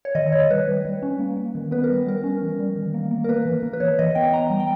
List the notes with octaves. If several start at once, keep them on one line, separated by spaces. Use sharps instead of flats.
C#5
D#3 D#5
D#3 C#5
G3 B4
G3
G3
C#4
A#3
A#3
D#3
B3 B4
A#4
G3
G3 A#4
C#4
E3
G3
D#3
A#3
A#3
A#4
A#3 B4
E3
A#3
B4
E3 C#5
E3 D#5
B3 G5
B3 A#5
G3
G5